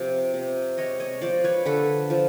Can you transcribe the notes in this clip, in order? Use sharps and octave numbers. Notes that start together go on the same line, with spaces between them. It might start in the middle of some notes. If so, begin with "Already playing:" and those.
Already playing: C3 F3
C3
G#3 C#5 D#5
C#5 D#5
F3 C5 D5
B4 C#5
D3 A4 B4
F3